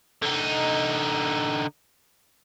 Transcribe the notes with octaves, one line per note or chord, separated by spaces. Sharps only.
D3 D#4